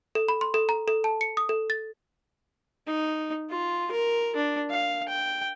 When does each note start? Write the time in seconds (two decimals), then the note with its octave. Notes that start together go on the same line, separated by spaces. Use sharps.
0.15 A4
0.28 B5
0.41 C6
0.54 A4
0.69 A#5
0.88 A4
1.04 A5
1.21 C#7
1.37 D#6
1.49 A4
1.70 A6
2.87 D#4
3.50 F4
3.91 A#4
4.36 D4
4.70 F5
5.08 G5